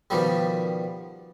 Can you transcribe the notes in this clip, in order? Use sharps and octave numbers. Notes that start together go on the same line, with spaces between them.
B2 D#3 F3 G3